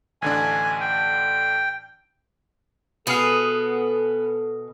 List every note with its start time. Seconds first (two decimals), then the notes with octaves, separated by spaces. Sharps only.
0.22 A1 D3 D4 G#5
0.81 G5
3.07 B2 B3 G#4 A4 F5